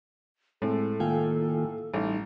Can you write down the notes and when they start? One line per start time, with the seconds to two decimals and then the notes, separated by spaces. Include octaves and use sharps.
0.62 A2 G#3 C4 A4
1.00 D#3 A#3 F4 F5 G5 G#5
1.94 A1 G3 D#4